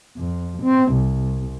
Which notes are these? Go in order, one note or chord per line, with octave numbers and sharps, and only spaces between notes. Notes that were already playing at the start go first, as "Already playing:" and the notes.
F2
C4
C2